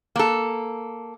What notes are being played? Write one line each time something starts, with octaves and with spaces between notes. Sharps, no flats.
A#3 A4